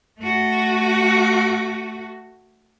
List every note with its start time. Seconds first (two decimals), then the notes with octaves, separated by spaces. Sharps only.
0.20 A3 F#4